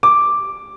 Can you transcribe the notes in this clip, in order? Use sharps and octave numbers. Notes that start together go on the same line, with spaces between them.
D6